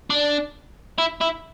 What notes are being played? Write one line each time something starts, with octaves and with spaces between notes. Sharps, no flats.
D4
E4
E4